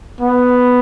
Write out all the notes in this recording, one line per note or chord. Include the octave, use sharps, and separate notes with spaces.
B3